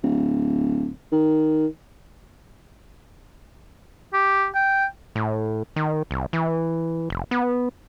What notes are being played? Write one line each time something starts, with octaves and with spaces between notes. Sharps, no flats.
D1
D#3
G4
G5
A2
D#3
C2
E3
F1
B3